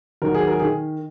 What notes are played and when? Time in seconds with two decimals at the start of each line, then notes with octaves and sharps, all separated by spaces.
0.22 D#2 D#3 F#3 A#4
0.34 G#4
0.48 A#4
0.60 D#3 G#4